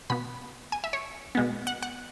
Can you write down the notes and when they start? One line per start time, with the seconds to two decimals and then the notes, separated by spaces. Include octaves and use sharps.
0.10 B2 B3 B5
0.72 G#5
0.84 E5
0.93 C#5
1.35 B2 G#3 B3
1.67 F#5
1.83 F#5